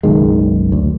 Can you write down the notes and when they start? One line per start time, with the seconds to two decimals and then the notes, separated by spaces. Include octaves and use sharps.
0.03 F#1 B1 D#3 G#3
0.72 D2